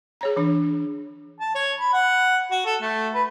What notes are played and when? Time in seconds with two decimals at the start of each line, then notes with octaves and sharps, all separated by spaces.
0.21 G#4 C#5 A#5
0.36 E3 D4
1.40 A5
1.55 C#5
1.79 B5
1.93 F#5
2.51 F#4
2.66 A4
2.82 A3
3.14 B4